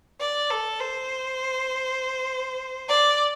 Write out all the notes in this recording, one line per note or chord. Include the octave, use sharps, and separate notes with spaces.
D5
A4
C5
D5